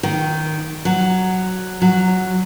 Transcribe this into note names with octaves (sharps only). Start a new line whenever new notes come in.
D#3
F#3
F#3